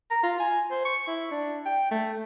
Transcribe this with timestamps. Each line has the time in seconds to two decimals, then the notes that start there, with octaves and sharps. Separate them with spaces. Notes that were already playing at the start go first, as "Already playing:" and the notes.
0.11 A#5
0.23 F4
0.40 G#5
0.71 C5
0.85 C#6
1.07 E4
1.31 D4
1.66 G5
1.91 A3